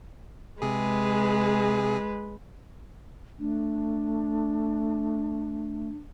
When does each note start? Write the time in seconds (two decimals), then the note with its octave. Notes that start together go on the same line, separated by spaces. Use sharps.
0.62 C3 G#3 G#4 B4
3.39 A3 D4